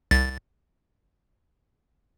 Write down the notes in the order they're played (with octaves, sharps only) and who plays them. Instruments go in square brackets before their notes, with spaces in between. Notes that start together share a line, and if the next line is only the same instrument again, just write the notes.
[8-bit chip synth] C2 A6